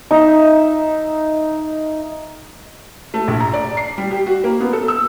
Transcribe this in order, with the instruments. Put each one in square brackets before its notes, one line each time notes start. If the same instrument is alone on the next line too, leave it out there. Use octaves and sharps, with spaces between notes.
[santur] D#4 E5
[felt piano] A3
A#1
A#5
D5
C7
G3
G4
F#4
A#3
B3
A4
E6